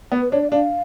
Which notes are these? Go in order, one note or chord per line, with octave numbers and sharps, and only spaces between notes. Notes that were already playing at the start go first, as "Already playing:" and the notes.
B3
B4
D4 C#5
D5
D4 F5